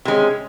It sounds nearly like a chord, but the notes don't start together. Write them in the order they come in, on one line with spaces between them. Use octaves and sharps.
C3 G#3 C#4